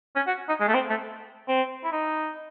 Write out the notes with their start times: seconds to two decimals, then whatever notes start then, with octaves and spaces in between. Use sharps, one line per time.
0.16 C#4
0.27 F#4
0.48 D#4
0.60 G#3
0.68 A3
0.74 C4
0.89 A3
1.48 C4
1.84 E4
1.92 D#4